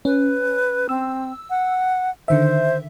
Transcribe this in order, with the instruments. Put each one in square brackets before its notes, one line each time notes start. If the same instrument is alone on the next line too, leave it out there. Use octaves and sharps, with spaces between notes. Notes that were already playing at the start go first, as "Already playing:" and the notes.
[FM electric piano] C#4 [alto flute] B4
[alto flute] C4 [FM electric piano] E6
[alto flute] F#5
[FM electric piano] D3 D#3 E5 [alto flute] C5